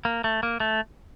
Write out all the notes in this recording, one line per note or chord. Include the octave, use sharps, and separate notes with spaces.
A#3
A3
A#3
A3